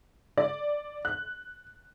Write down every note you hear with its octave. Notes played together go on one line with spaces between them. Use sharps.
D5
F#6